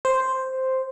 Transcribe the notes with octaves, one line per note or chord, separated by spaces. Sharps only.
C5